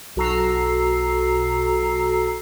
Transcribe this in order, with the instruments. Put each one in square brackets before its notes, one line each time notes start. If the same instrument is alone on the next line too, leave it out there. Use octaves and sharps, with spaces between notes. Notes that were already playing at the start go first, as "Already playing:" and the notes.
[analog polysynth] B1 F#4 A4 A#5 E6 C7